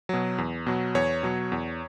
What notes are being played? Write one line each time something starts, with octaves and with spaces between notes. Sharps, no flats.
B2 F#3
E2
B2 F#3
E2 C#5
B2 F#3
E2